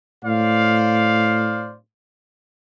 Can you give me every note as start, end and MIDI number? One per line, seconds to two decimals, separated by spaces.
0.25 1.76 45
0.25 1.73 72
0.25 1.73 74
0.25 1.73 77